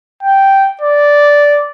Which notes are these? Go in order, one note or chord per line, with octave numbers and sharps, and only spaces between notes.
G5
D5